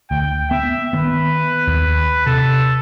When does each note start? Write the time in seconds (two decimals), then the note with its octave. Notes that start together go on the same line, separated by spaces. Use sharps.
0.11 D2 G5
0.51 B3 E5
0.93 D#3 B3 B4
1.68 D#2
2.27 C3 A4